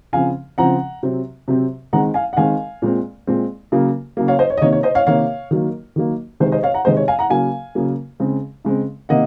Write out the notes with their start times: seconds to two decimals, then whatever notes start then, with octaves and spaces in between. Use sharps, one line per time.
0.13 C#3 F3 C4 F5 G#5
0.58 C#3 F3 C4 F#5 A#5
1.03 C3 F#3 C4
1.48 C3 F#3 C4
1.93 D#3 G#3 C4 F#5 A#5
2.14 F5 G#5
2.33 F#5
2.37 D#3 G#3 C4 F5 G#5
2.82 A#2 G#3 C4
3.27 A#2 G#3 C4
3.72 C#3 F#3 A#3
4.17 C#3 F#3 A#3
4.28 C#5 F5
4.39 C5 D#5
4.50 C#5
4.57 D#5
4.61 C3 D#3 A#3 C#5
4.72 C#5
4.83 C5 D#5
4.95 C#5 F5
5.07 C3 D#3 A#3 C#5 F5
5.51 D#3 F#3 A#3
5.96 D#3 F#3 A#3
6.40 C3 D#3 G#3 C4 C5
6.52 C5 D#5
6.63 C#5 F5
6.74 F#5 A#5
6.85 C3 D#3 G#3 C4 C5 D#5
6.97 C#5
7.08 F5 G#5
7.19 F#5 A#5
7.30 C#3 F#3 A#3 F5 G#5
7.75 C#3 F#3 A#3
8.20 C#3 G#3 C4
8.65 C#3 G#3 C4
9.09 C3 D#3 A#3 D#5 F#5